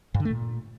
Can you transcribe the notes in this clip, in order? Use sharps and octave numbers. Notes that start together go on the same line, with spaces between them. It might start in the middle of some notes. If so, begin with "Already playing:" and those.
G2
D3
A3
A#2